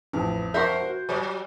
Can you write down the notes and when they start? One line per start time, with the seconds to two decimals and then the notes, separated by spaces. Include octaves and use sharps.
0.13 A1 F2
0.54 A#4 C5 E5 F#5 C#6 G6
0.81 F#4
1.09 F#3 C#5